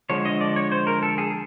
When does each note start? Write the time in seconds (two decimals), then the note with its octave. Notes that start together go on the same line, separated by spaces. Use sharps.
0.10 D3 F3 G#3 C#5
0.25 D#5
0.41 D5
0.56 C#5
0.72 C5
0.87 A#4
1.03 A4
1.18 G#4